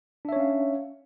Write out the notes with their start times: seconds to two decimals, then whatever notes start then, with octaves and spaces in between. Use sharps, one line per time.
0.25 D4
0.29 E5
0.32 C#5
0.36 C#4
0.40 F5